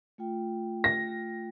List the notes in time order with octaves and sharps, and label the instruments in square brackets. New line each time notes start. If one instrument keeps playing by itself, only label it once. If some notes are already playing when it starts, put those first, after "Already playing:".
[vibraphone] A3 F4 G5
[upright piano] A#6